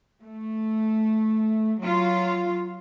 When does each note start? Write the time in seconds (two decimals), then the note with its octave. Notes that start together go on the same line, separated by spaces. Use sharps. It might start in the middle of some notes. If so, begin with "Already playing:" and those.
0.23 A3
1.81 F#3 F4